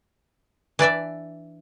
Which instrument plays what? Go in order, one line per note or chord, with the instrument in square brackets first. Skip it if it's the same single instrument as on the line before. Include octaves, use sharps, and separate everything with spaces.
[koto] E3 D4 D5 E5